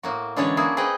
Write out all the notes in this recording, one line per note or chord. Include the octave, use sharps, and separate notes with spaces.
A2 A#3 F#4
D3 E3 G#3 C#4 D4 C#5
A#3 E4 F#4 G#4
C4 G#4 B4 D#5 F#5 G5